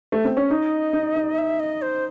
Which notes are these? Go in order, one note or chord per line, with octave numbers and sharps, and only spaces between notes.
A3
C4
C#4
D#4 D#5
D#4
D#4
E5
D#5
C5